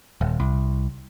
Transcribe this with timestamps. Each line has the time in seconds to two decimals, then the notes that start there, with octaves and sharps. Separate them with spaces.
0.21 D#1
0.40 C2